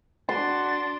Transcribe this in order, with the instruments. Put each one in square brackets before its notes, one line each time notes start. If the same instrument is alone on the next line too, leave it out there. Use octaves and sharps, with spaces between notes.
[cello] D4 [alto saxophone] F#4 [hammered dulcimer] C6 [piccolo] A6